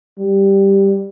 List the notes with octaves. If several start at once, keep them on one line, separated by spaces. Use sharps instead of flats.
G3